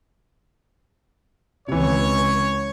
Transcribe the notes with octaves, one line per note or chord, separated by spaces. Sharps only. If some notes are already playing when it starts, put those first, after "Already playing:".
C#2 C3 E3 C#5